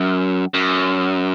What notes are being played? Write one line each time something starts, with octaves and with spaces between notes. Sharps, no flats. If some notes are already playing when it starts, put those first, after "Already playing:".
Already playing: F#2
F#2